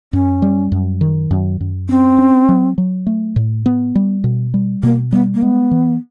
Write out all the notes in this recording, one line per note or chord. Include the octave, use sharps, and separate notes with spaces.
F#2 C#4
G3
F#2
D#3
F#2
F#2
C4 C#4
C#4
F#3
F#3
A3
A2
B3
G3
B2
G3
B2 A#3
G3 B3
A#3
G#3 B3
E3